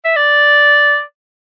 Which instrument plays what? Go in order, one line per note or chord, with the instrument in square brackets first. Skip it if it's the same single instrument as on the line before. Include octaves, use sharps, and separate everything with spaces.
[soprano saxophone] E5
D5